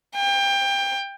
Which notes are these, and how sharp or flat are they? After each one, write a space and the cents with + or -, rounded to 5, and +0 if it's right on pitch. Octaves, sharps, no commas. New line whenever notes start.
G5 +25